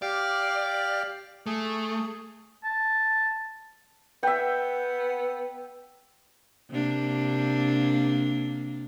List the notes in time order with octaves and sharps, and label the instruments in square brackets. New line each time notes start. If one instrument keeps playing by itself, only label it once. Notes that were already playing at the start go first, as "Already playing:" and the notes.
[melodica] G4 F5 [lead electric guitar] D5
[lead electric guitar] A3 [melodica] G#4
[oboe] A5
[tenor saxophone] B3 [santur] E5 G5
[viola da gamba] C3 A#3 D4